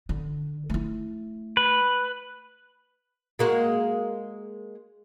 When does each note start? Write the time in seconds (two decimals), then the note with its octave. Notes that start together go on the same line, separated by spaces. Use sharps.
0.09 D3
0.70 A3 E4
1.57 B4
3.39 G#3 A#3 F#4